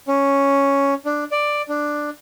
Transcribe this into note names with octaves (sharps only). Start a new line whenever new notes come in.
C#4
D4
D5
D4